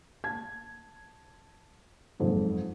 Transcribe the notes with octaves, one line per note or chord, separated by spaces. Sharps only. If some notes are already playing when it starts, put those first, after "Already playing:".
A5 G#6
F#1 F2 G#2